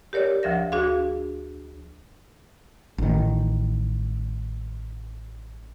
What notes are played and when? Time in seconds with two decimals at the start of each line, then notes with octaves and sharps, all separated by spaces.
0.13 G4 A#4 C#5 D5
0.43 D2 F3 E5 A#6
0.72 D4 F#4 G#4 F5
2.98 A1 D#3